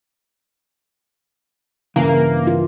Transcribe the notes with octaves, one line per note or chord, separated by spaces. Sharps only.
G2 C#3 E3 A#3
F4